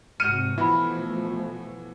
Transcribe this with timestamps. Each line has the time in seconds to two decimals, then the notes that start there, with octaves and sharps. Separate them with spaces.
0.20 G#1 C3 F#4 F6 G6 C#7 D#7 E7
0.58 B2 E3 F3 A3 E4 F#4 E5 B5